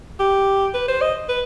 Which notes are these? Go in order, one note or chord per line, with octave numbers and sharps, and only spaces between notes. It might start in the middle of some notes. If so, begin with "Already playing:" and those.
G4
B4
C5
D#5
B4